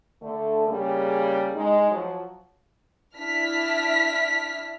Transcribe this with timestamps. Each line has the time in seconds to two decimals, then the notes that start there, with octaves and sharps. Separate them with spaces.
0.22 D3 A3
0.68 C#3 G3 A#3 G#4
1.55 G#3 D#4
1.90 F3 F#3
3.14 D4 E4 F6 B6